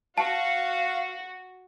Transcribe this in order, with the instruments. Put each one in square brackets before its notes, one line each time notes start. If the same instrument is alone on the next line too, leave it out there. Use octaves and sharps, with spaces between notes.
[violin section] F#4 [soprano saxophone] F5 [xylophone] A5